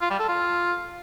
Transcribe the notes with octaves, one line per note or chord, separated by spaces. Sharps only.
F4
G3
A4
F4